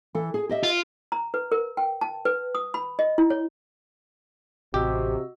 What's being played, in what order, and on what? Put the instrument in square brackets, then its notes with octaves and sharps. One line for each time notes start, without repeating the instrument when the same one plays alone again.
[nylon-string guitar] E3 A4
G#4
G4 D#5 E5
[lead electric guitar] F4
[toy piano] A#5
B4
A#4
G5
A5
B4
D#6
B5
D#5
E4
C#5
[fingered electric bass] A1 [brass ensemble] C3 [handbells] F#4 D#5 E6 [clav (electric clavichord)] G4